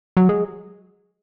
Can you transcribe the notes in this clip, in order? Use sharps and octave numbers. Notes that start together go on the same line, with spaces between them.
F#3
G#3